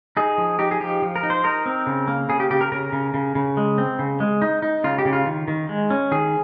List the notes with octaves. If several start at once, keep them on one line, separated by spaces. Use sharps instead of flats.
D#4 G#4
F3
D#4 G4
G#4
F3 G4
F3
A#4
D#4
C5
D#4 A#4
C4
C#3
A#3
C#3 G#4
G4
C#3 G4
A#4
C#3 A#4
C#3
C#3
C#3
G#3
C4
C#3
G#3
D#4
D#4
C#3 F4
G4
C#3
F4
D#3
D#3
G#3
C#4
D#3 G#4